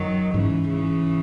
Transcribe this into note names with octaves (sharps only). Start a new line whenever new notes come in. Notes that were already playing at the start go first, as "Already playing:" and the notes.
Already playing: F#2 D#3 F#3
G#2 C#3 E3
C#3 E3